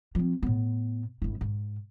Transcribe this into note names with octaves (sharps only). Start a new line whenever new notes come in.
F3 C4
A2 B3
G1 E4
G#2